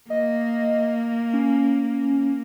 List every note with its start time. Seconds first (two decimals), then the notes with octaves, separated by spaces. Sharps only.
0.10 A#3 D#5
1.33 C#4